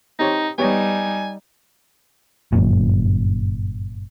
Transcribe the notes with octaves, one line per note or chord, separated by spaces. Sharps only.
C4 D#4 G4 C#5
G3 B3 D#4 G4 C#5 G#5
G1 F#2 A#2